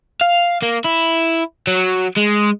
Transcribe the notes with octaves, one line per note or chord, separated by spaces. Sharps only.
F5
A#3
E4
F#3
G#3